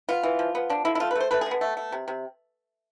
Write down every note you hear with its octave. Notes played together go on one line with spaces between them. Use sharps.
B3 F4
E3
F3
B3
F3 D4
D3 E4
E4
A3 F4
B4
A3 C5
A3 B4
D3 G#4
B3
A3
A3
C3
C3